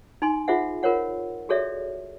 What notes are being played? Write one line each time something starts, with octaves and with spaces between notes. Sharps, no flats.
D#4 G#5 C6
F4 G#4 C5 E5 F#5
F4 A#4 C5 C#5 F#5
F#4 G#4 A4 C#5 D5 E5